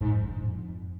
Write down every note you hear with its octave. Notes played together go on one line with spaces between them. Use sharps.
G#2
F2
D3
A2
F2